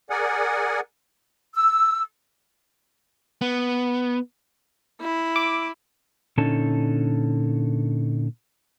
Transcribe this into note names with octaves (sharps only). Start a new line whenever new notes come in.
G#4 A#4 D5 F#5 G#5
E6
B3
E4
D6
A#2 D3 C#4 D#4 A4 A5